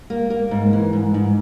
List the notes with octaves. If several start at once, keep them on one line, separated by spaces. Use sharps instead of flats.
A#3
A#3
G#2
E3
G#2
G#2